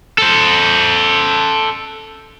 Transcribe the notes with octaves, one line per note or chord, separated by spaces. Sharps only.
A4 C5